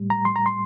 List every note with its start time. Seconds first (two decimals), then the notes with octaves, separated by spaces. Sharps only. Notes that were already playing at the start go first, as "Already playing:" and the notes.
Already playing: A2 G3
0.10 A#5
0.25 C6
0.36 A#5
0.46 C6